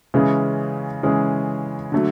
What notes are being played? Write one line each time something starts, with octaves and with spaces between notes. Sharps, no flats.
C#3 E3 G#3 C#4 G#4
C#3 E3 G#3 C#4 G#4
D3 F#3 A3